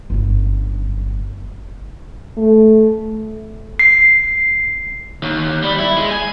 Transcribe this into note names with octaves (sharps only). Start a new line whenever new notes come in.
G1 F#2
A3
C7
D#2
G3
E4
G#3
G#5